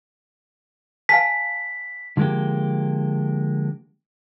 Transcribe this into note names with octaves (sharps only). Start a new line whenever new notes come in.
F5 G#5 A5 B6
D3 F3 G#3 A#3 G4